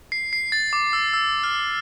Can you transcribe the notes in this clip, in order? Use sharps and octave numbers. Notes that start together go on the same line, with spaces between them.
C7
C7
A6
D6
E6
E6
F6